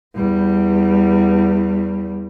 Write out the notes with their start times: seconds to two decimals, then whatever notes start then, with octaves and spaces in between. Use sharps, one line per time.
0.15 E2 G3